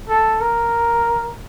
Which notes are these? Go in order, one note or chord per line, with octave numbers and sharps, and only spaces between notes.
A4
A#4